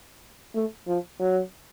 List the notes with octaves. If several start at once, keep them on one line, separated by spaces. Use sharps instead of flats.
A3
F3
F#3